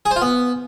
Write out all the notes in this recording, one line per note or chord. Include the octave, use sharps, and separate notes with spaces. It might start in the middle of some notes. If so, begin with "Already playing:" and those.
G#4
C5
F4
B3